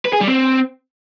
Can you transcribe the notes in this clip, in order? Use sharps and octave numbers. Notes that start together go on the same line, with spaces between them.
B4
G#4
G3
C4